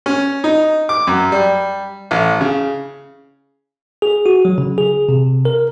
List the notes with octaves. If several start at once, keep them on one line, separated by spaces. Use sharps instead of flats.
C#4
D#4
D6
F#2
G3
A1
C#3
G#4
F#4
F#3
C#3
G#4
C3
A#4